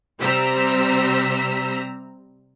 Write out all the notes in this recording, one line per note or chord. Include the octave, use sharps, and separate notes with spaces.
C3 G3 C4 A#5 E6 B6